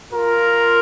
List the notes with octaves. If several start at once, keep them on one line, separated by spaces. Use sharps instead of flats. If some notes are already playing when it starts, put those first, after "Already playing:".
F4 A#4